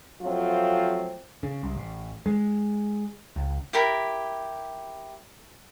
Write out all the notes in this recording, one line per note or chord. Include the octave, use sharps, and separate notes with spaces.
F3 F#3 A3 C4 F4
C#3
C2
A1
G#3
C#2
E4 G4 A#4 B5